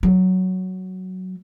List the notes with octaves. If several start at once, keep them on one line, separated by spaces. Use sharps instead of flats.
F#3